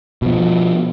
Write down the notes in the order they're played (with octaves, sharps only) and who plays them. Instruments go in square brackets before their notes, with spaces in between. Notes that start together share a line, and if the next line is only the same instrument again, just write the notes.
[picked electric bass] B2 F3